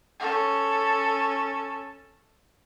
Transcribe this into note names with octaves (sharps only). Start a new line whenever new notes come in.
C#4 A4